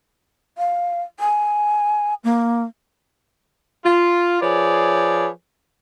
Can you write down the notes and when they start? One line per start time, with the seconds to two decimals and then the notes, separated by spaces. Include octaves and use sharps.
0.58 F5
1.20 G#5
2.24 A#3
3.84 F4
4.41 F3 G#4 B4 C#5 D5